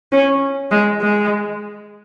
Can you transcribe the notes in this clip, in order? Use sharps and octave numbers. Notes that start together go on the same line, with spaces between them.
C#4
G#3
G#3